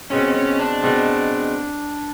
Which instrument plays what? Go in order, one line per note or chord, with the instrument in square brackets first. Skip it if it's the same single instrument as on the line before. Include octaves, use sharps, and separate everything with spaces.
[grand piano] B2 G#3 C4 [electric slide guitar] C#4
[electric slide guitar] C#4
D4
[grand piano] B2 G#3 C4